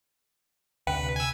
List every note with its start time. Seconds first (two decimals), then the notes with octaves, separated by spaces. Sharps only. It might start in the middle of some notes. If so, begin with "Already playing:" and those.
0.87 D2 C3 B4 G5
1.16 G#5 E6